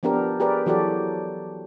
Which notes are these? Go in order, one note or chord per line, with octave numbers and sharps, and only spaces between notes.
F3 B3 D4 G4 A#4
G4 G#4 A#4 B4 D5
E3 F#3 F#4 G4 A4 D5